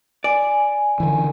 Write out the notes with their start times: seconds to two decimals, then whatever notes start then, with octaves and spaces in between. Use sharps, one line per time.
0.24 D5 G#5
1.00 D3 E3